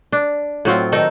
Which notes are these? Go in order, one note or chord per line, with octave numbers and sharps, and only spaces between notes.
D4
A2 F#3 C4 F4
D#3 D#4 A4